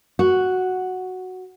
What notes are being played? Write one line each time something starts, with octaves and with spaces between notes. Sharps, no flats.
F#4